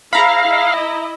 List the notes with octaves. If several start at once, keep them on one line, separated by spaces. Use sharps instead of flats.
E4 G#4 C5 F5 A#5 B5
E4 D#5